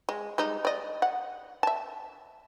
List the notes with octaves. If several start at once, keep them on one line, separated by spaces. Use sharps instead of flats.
G#3
G3 G#3 D#4
D5 D#5
F#5
E5 A5